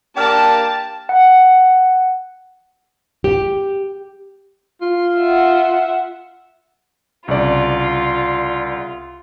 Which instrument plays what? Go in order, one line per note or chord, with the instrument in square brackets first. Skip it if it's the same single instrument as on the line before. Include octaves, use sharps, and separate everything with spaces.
[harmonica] A#3 D4 G4 [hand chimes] G5 F6 [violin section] A5
[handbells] F#5
[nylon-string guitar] G4
[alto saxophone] F4
[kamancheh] E5 F#5
[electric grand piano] C2 C#3 D5 [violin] F4